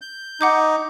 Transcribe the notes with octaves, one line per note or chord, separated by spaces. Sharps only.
G6
D#4 F#5 D6 G6